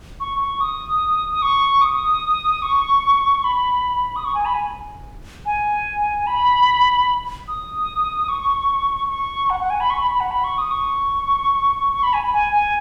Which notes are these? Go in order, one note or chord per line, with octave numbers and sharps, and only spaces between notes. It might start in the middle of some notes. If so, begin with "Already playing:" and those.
C#6
C#6
D#6
D#6
C#6
D#6
C#6
B5
D#6
C#6
G#5
B5
G#5
G#5
B5
D#6
C#6
C#6
F#5
F#5
G#5
B5
C#6
B5
B5
F#5
B5
C#6
D#6
C#6
C#6
B5
G#5
B5
G#5
G#5